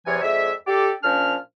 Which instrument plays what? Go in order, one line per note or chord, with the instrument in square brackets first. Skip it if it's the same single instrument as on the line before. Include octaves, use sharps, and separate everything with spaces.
[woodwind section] E2 C3 F3 C#5 G#5
F2 G#3 D5 E5
G4 A4 D5
A#2 F3 C#4 D4 F6